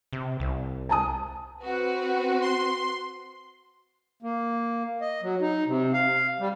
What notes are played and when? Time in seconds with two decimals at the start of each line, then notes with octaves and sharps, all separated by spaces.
0.13 C3
0.40 C2
0.89 G#5 A5 D#6
1.64 C4 F#4 B4
2.41 C6
4.23 A#3
5.01 D#5
5.23 F#3
5.41 D#4
5.67 C3
5.93 F5
6.40 G3